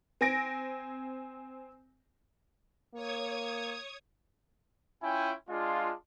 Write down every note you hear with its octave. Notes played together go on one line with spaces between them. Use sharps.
C4 G#5 A#6 D7
A#3 C#5 D#6 G#6
C#4 E4 F4 G5 G#5
G#3 D4 F4